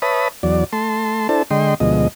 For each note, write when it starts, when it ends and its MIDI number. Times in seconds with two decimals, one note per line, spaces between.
0.02 0.28 71
0.02 0.28 73
0.02 0.28 76
0.02 0.28 81
0.02 0.28 83
0.02 0.28 87
0.43 0.64 40
0.43 0.64 54
0.43 0.64 74
0.73 1.28 57
0.73 1.28 81
0.73 1.28 84
1.29 1.43 62
1.29 1.43 64
1.29 1.43 69
1.29 1.43 72
1.29 1.43 81
1.51 1.75 50
1.51 1.75 56
1.51 1.75 75
1.51 1.75 79
1.51 1.75 84
1.80 2.08 38
1.80 2.08 47
1.80 2.08 53
1.80 2.08 56
1.80 2.08 75